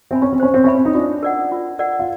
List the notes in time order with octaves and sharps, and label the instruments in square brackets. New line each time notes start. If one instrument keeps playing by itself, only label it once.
[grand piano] C4 [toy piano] E5 G#5 B5
[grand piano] C#4
C4
[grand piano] C#4 [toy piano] C5
[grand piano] C4
[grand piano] C#4 [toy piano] E5 G#5 B5
[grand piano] C4
D#4
[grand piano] D4 [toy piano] F4
[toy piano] A#4 D5 F#5
F4
A#4 D5 F#5
[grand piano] F4